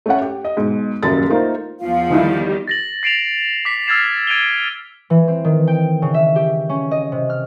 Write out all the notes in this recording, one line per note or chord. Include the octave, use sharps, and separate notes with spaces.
A3 C#4 C#5 F#5
G4
D#5
G#2 B2
D#1 F#2 C#3 A4 A6
A3 A#3 D#4 F4 A#4 C5
E2 F3 F4 F5
D3 D#3 G3 D#4 E4
A6 A#6 F#7
A6 C7 D7 E7 F7
D6 B6
E6 F6 G#6 A6 C7 E7
G#6 D7 D#7 F7 G7
E3
C4
D#3
G5
C#3
E5
G4
C#4
D#5
C3
F6